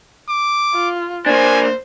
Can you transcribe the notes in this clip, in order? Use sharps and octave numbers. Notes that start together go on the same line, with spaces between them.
D6
F4
A#3 D4 C5 G#5